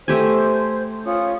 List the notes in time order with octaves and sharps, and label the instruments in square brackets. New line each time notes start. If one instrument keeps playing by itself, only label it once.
[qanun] A3 G4 G#5 [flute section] C5
[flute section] C#4 F4 D#6